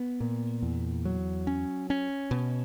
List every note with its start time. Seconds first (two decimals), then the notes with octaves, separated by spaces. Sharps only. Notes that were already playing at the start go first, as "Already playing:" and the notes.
Already playing: B3
0.20 A#2
0.62 E2
1.05 F#3
1.47 C#4
1.90 C#4
2.31 B2